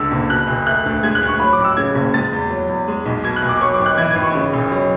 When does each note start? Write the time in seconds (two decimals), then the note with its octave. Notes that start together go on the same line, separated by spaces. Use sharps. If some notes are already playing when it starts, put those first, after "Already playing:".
Already playing: C#2 D3 E6
0.12 F#1
0.30 B2 F#6
0.48 E1
0.67 A3 F#6
0.86 D2
1.03 G#3 G#6
1.15 F#6
1.21 D2
1.27 C#6
1.40 F#3 B5
1.53 D6
1.58 A1
1.64 E6
1.77 C#3 G#6
1.95 F#1
2.14 G#3 A6
2.32 E2
2.50 F#3
2.69 E2
2.88 G#3
3.06 B1
3.24 B2 G#6
3.36 F#6
3.42 E1
3.49 D6
3.60 F#3 C#6
3.74 D6
3.79 G#1
3.86 F#6
3.98 E3 G#6
4.11 G#6
4.16 G#1
4.23 C#6
4.35 C#3
4.53 E1
4.72 F#3